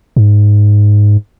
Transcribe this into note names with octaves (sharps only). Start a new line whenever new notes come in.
G#2